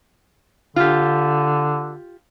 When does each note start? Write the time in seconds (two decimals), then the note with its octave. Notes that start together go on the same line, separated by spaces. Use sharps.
0.76 D3 F4 G4